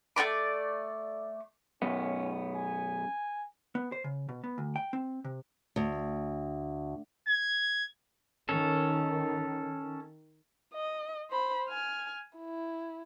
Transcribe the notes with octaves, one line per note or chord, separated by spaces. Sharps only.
A3 C4 D5 D6
B1 F#2 B3 C#4
G#5
B3
C5
C#3
B2
B3
D2
G5
C4
C3
D2
G#6
D#3 C#4 A4
D#5
C5 B5
G#5 F6
E4